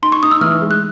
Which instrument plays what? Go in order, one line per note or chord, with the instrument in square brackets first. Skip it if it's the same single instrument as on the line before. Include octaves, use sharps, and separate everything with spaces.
[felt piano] D#4 [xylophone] C6
[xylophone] C#6
[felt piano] D#4 [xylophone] D#6
[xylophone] E6
[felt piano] E3 [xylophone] F6
[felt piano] G#3
[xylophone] F#6